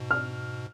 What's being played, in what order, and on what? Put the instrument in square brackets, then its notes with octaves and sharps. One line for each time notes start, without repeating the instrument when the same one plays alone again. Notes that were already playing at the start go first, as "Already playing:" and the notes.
Already playing: [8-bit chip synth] G#2 B2
[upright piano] F6